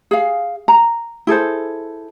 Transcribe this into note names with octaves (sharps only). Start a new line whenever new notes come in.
G#4 F5
A#5
E4 G#4 A4 C5